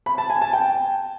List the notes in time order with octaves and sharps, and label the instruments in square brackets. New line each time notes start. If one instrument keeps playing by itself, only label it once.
[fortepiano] B5
A5
G#5
A5
G5